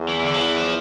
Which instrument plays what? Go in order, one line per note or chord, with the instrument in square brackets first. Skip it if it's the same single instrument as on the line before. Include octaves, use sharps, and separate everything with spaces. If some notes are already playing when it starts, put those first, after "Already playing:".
Already playing: [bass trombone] E2
[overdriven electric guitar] E3
E3
D3
F3
E3
F3